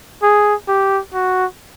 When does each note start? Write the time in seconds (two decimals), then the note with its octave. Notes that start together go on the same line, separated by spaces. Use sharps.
0.23 G#4
0.68 G4
1.14 F#4